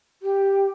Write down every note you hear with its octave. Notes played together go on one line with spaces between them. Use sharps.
G4